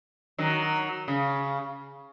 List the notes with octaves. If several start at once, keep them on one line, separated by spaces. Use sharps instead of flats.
D#3 F#3
C#3